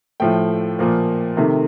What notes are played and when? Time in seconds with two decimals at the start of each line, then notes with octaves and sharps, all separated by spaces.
0.20 A2 F3 A3 G5
0.79 A#2 F3 A#3
1.37 C3 D#3 A3